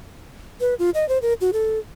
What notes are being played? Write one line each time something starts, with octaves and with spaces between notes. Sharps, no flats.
B4
F4
D#5
C5
A#4
F#4
A4